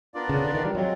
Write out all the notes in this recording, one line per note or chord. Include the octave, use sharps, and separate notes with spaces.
B3 D4 F4 A#4 D5
C#3
D3
D#3
G3
F#3 G#3 C4 F4